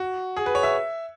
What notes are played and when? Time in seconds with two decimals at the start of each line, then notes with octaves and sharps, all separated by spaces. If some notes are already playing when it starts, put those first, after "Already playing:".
Already playing: F#4
0.36 G#4
0.46 B4
0.55 C#5
0.63 E5